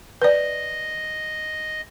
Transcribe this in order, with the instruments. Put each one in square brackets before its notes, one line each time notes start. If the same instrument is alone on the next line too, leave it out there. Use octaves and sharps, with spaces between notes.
[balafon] B4 D5 [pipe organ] D#5